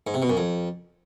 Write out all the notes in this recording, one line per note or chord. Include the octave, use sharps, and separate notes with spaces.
G#2
C3
B2
F#2
F2